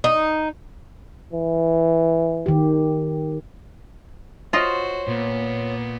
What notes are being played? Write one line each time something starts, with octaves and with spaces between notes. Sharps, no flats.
D#4
E3
D#3 G4
F4 F#4 C5 C#5 D#5
A#2 B3